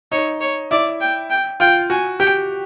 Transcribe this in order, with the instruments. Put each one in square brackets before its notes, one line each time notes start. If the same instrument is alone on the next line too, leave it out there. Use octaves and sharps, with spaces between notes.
[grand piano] D#4 [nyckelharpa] C#5
[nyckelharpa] C#5
[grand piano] E4 [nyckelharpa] D5
[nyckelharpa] G5
G5
[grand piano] F4 [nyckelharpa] G5
[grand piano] F#4 [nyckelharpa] G#5
[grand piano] G4 [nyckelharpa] G5